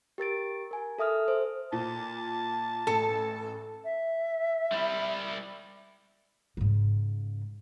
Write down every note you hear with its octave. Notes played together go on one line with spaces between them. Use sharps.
G4 A#4 A6 D7
A#4 G#5
A4 E5 D#6 F6
C5
A#2 A5
A1 A4
E5
G3 E4
G#2 C#3